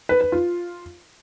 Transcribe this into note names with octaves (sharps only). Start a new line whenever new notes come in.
B4
B4
F4